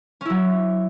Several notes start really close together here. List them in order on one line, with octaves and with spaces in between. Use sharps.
C#4 E4 F#3